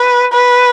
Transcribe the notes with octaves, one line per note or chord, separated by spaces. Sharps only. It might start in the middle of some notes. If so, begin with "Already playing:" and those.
Already playing: B4
B4